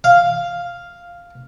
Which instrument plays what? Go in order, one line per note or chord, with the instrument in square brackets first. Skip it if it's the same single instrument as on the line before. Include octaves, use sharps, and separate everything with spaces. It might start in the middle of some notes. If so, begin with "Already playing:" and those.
[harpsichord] F5